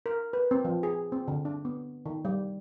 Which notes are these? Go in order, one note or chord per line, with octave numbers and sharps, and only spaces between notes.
A#4
B4
C4
F3
G#4
C4
D3
D4
B3
D#3
G3